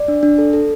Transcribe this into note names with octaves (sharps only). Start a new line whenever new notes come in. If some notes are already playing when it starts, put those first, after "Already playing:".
Already playing: D5
D4
D4
A4
A4